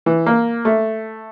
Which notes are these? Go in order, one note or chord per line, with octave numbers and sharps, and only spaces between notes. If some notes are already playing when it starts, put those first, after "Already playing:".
E3
A#3
A3